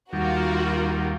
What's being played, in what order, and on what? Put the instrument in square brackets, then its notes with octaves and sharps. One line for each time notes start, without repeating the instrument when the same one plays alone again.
[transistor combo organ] D#2 G3 [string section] F4 F#4 A#4